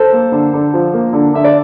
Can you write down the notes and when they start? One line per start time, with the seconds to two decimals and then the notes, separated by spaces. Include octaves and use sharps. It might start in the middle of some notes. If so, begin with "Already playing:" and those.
Already playing: A4 C5
0.13 A#3
0.32 D3
0.53 D3
0.73 F3
0.94 A#3
1.13 D3
1.34 D3 E5
1.44 D5